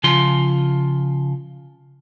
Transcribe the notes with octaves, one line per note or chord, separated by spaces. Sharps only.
C#3 F3 F4 C6